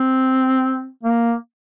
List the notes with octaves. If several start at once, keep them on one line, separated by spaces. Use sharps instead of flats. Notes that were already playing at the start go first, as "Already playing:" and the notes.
Already playing: C4
A#3